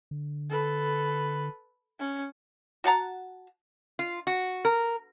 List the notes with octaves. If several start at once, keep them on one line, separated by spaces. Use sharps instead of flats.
D3
A4 B4
C#4
F#4 F#5 A5 A#5
F4
F#4
A#4